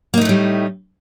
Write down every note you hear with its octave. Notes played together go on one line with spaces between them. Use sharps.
A2 G3 A3 A#3 D#4